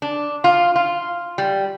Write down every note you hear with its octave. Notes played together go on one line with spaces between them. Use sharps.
D4
F4
F4
G3